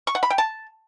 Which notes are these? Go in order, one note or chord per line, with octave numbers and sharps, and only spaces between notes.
C#6
F#5
B5
G5
A5